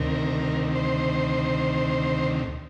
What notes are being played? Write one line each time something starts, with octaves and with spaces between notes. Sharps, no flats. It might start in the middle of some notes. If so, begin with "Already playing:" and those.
Already playing: D2 C3 D#3 A#4
C5